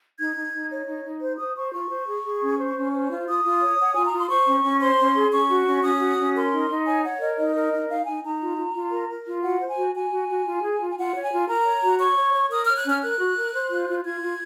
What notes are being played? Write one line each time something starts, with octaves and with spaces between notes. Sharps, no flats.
D#4 G#6
D#4
D#4
C#5
D#4
D#4
C5
C5 D#6
C5 C#6
F4 C#6
C5
G#4
G#4
C#4
C5
C#4
C5
F4
F4 D#6
F4
C#5
C#5 F#5
F4 G#5
A#5
F4 C6
C5 C#6
C#4
C#4
C5 C6
C#4
G#4
C#4 C#6
F#4
C#4
C#4 D#6
F#4
C#4
A#4 C6
D#4
D#4
C#5 G#5
C#5 F#5
A#4 D#5
D#4 D#5
A#4
D#4
D#4 F5
D#4 G#5
D#4 A#5
F4
F4
F4
A#4
A#4
F4
F#4 F#5
C5
G#5
F#4
F#4 G#5
F#4
F#4
F4
G#4
F4
G#5
F4 F#5
C#5
G#5
F4
A#4 A#5
C#5
F#4
C#5 C#6
C#5
C#5
A#4 D#6
C#5 F6
F#6
C#4 F6
A#4 F#6
F#4
A#4
C5
F4
F4
F4 G#6
F4